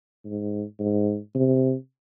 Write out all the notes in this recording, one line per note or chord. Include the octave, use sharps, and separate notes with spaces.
G#2
G#2
C3